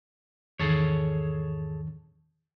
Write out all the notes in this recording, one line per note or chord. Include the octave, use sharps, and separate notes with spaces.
E2 G#2 D#3 G#4 A4 C#5